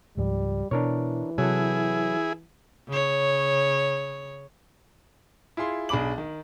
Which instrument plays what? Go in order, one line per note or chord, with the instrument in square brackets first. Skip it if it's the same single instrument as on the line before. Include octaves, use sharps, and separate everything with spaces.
[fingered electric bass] C#2 G#2 F3 [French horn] G3
[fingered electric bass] B2 [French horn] E3 [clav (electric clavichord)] D4 A#4 C#5
[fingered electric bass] C3 [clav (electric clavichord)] F#3 A4 [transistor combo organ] E4 G#4
[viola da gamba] C#3 C#5
[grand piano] E4 F4 G#4 C6
B1 D4 G#4 B5 D6 F#7
D#3